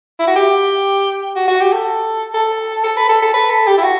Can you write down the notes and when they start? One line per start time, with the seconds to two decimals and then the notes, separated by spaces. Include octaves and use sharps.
0.20 E4
0.28 F#4
0.36 G4
1.36 F#4
1.48 F#4
1.60 G4
1.73 A4
2.34 A4
2.84 A4
2.97 B4
3.09 A4
3.22 A4
3.34 B4
3.50 A4
3.67 G4
3.78 E4
3.83 F#4